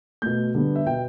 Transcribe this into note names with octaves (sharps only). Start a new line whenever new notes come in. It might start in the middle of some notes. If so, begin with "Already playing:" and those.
B2 A3 G6
D3 G3 B3
E5
B2 B3 G5